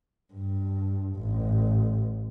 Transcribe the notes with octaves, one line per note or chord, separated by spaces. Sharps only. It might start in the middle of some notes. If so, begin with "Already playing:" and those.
G2
A1